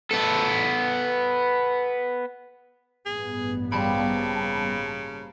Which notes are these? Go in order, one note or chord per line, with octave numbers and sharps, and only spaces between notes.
B3 A4
A1 G2 B3 G#4
C#3 F3 G3 A#3 G4 A5 B5